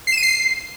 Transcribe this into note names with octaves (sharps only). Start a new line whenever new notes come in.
C7
E7
D#7
C7